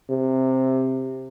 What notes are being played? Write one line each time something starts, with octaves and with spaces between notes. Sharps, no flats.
C3